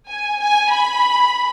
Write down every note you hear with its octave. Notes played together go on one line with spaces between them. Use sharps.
G#5
G#5
B5